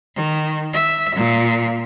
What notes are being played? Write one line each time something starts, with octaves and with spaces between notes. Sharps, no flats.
D#3
E5
A#2